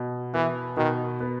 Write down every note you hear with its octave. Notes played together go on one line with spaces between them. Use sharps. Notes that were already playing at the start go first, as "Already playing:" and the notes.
Already playing: B2
E3 B3
B2 D#3
B3